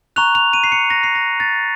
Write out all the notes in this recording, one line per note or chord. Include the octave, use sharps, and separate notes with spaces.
A#5 C#6 F#6 F7
F7
D#7
C7
C#7
A#6
C7
A#6
A6